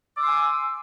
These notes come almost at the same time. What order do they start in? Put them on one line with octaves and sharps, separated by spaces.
D6 E6 C6 G#5